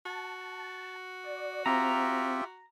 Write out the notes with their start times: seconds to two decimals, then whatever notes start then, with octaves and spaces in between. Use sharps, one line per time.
0.05 F#4 A5
1.24 D5
1.66 C4 F4 G4 E5 A#5